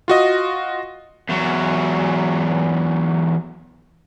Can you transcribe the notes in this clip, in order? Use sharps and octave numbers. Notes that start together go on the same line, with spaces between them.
F4 F#4 D#5
E2 F#3